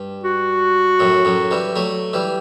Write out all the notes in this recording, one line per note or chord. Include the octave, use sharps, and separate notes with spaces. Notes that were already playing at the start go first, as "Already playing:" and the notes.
Already playing: G2
F#4
F#2 A2
F#2 A2
E3 G3
F#3 A3
E3 G3